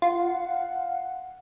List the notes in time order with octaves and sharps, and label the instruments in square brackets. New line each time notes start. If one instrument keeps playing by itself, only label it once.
[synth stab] F4 [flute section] F5 F#5